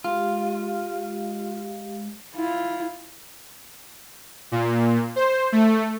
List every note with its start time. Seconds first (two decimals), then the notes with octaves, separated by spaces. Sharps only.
0.04 G#3 F4 G4 F5
2.36 E4 F4
4.52 A#2
5.16 C5
5.52 A3